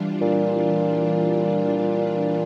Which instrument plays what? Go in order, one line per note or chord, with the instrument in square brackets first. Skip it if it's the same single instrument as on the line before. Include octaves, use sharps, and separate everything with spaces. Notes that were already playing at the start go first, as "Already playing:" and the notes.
Already playing: [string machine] E3 G3 D4 F4
[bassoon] A#2